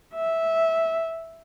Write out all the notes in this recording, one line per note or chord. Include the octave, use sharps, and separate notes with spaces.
E5